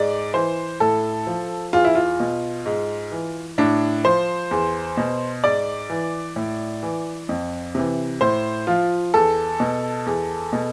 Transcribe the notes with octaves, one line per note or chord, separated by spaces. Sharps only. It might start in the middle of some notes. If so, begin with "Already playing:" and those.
Already playing: G#2 D5
E3 C5
A2 A4
F3
E2 F4
E4
F4
B2
G#2
E3
A2 D4
F3 C5
E2
B2
G#2 D5
E3
A2
E3
F2
C3 E3
A2 C5
F3 F4
E2 A4
B2
E2
B2